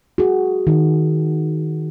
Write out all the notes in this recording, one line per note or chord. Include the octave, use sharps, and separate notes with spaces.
F#4 G#4
D#3